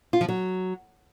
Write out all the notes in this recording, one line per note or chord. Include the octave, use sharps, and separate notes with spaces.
F4
F3
F#3